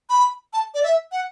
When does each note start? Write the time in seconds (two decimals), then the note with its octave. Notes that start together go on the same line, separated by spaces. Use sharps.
0.10 B5
0.53 A5
0.74 D5
0.83 E5
1.12 F#5